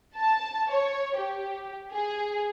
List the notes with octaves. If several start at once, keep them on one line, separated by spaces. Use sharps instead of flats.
A5
C#5
G4
G#4